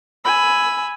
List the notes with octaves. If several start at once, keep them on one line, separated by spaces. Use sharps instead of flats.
G#5 B5 E6